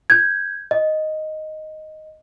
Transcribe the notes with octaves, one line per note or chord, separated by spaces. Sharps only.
G6 G#6
D#5